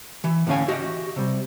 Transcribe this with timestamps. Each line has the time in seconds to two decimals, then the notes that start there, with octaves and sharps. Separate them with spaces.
0.24 E3
0.47 A2 D3 C#4 F5 G#5
0.68 F#4 G4 D#5 E5
1.16 C3 G3